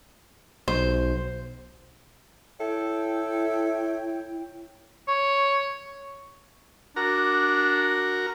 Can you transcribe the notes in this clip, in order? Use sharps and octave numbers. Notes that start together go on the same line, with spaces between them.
B1 C5
E4 A4 C#5 E5 G5
C#5
D4 F#4 A#4 A#5